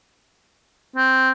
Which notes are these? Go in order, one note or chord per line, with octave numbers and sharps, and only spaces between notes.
C4